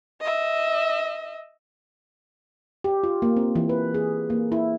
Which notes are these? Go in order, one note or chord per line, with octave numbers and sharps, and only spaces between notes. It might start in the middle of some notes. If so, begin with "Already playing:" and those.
D#5 E5
G4
F4
A#3
C4
E3
B4
G#4
A#3
E4